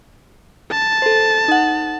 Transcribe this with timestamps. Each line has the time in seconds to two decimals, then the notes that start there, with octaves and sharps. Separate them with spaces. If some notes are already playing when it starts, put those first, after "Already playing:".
0.71 A5
1.02 A4 C5
1.48 D#4 F#5